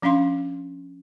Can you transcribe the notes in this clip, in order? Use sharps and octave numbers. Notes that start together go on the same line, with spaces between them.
F3 C#4 D4 F5 C6